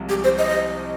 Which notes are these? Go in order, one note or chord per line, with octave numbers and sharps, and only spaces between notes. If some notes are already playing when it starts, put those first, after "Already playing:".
Already playing: C2 C3 F3 G#3
G4
C5
D#5